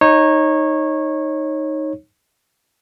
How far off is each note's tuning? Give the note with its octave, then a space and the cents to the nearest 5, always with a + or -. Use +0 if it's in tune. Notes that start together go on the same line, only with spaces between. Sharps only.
D#4 +0 C#5 -20